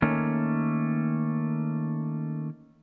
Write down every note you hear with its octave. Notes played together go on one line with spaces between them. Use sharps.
D#3 A3 A#3 C#4